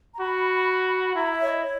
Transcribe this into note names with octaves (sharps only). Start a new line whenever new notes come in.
A#5
F#4 B5
E4 A#5
E5
C#5
D#5
C#5